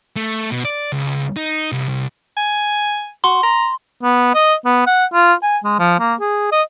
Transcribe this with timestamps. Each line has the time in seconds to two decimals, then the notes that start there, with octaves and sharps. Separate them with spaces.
0.16 A3
0.51 B2
0.65 D5
0.92 C#2
1.37 D#4
1.72 C2
1.88 C2
2.37 G#5
3.24 F#4 C6
3.43 A#5
4.03 B3
4.34 D#5
4.65 B3
4.87 F#5
5.13 F4
5.43 G#5
5.63 G#3
5.79 F3
5.99 A#3
6.20 G#4
6.52 D#5